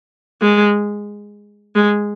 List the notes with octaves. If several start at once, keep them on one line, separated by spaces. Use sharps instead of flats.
G#3
G#3